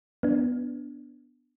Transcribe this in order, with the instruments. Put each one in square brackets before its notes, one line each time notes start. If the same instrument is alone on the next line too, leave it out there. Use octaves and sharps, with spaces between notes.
[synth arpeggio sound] B3 D4